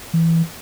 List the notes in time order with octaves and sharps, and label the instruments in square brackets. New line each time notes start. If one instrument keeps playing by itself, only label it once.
[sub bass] E3